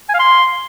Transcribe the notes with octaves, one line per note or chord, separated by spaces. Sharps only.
G#5
F5
C6